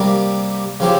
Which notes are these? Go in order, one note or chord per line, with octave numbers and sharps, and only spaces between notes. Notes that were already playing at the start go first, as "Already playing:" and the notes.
Already playing: C3 G3 A#3
C#3 F3 C4 G4